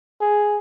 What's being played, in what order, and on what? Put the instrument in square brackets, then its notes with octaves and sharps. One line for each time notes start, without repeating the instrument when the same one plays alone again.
[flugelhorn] G#4